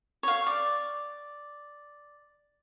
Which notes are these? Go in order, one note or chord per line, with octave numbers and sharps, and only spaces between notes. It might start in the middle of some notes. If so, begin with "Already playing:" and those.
C#5 F5
D5